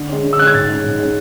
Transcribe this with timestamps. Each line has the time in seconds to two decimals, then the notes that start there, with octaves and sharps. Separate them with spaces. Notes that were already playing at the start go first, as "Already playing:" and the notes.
Already playing: D3
0.09 G#3 C#4
0.23 D3
0.33 E6
0.39 G#3 C#4 F#6
0.47 G#6
0.54 G#2 A6
0.69 G#3 C#4
0.84 G#2
0.99 G#3 C#4